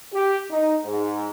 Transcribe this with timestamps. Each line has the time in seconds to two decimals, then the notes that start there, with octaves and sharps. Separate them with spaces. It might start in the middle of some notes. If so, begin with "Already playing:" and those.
0.13 G4
0.50 D#4
0.85 G#2